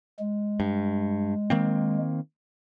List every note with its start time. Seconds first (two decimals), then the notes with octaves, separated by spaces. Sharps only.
0.19 G#3
0.60 G2
1.50 D#3 A#3 C4